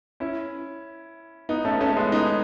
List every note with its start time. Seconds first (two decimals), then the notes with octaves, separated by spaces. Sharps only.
0.20 C#4 E4
1.49 B3 D#4
1.65 A3 C#4
1.74 B3
1.80 A3 C#4
1.92 A3
1.97 G#3 B3
2.12 B3 D#4